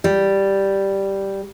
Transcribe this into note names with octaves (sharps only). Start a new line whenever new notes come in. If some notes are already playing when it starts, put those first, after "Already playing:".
G3